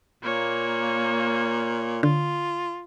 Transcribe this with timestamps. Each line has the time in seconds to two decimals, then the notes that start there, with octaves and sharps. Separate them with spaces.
0.23 A#2 A#3 C#5
2.03 D3 F4